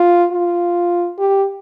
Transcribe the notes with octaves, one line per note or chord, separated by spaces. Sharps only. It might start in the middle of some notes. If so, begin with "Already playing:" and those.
Already playing: F4
F4
G4